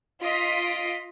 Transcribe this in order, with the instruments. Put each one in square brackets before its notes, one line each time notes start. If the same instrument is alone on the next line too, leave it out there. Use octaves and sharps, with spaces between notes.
[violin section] F4 D#5 B6 C7 D7